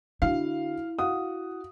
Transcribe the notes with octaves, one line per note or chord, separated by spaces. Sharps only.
D3 E4 F#4 F5
F#4 F5 F#5 D#6